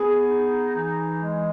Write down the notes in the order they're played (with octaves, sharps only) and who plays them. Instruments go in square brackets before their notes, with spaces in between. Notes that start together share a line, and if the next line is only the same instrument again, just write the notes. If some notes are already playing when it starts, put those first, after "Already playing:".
Already playing: [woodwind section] B3 [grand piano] G#4
[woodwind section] D#4
E3
G#3